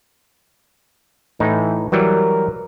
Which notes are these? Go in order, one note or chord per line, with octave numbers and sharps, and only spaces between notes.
A2 E3 D#4
E3 F#3 G3 A#4